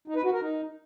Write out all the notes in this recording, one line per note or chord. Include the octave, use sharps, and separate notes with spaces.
D#4
B4
F#4
A#4
D#4